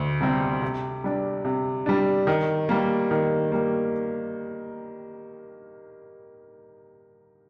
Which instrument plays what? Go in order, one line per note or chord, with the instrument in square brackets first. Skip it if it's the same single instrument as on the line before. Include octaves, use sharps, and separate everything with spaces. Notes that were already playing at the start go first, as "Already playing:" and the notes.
Already playing: [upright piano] D2
C3 G3 C4
C3
G3 D4
C3
G3 D4
D#3
G3 A#3
D#3
G3 A#3